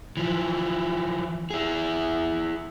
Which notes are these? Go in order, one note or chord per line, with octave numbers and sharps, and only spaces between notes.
E3 F3
E4 G#4